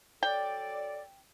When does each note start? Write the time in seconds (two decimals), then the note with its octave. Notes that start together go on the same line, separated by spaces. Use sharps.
0.23 F#3 A4 D5 G5